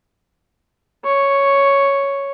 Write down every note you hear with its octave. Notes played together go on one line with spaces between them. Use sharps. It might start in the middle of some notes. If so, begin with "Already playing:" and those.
C#5